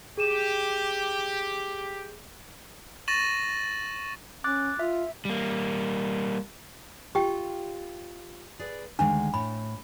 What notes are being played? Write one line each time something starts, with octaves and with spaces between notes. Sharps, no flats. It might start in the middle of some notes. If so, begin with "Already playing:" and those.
G4 G#4 D#7 E7
C#6 A6 A#6 D#7 E7 F#7
C#4 D6 F#6 A6
F4 E5
G3 A#3
F4 G4 G5
G#4 B4 D5
D2 D#3 G#3 D4
A2 B5